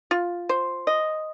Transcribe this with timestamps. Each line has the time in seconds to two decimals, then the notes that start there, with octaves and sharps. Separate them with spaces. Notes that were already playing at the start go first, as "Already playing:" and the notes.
0.11 F4
0.49 C5
0.87 D#5